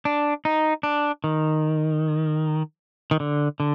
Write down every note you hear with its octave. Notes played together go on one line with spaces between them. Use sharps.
D4
D#4
D4
D#3
D#3
D3
D3